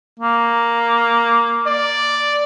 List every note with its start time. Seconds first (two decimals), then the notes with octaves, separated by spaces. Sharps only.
0.20 A#3
1.66 D5